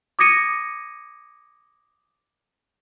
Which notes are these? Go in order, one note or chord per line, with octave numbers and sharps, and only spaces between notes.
D6 D#6 G#6 A#6 C#7 D#7